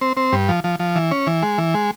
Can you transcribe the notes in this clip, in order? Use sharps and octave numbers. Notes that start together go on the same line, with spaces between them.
C4
C4
G2
F3
F3
F3
E3
C#4
E3
G#3
E3
G#3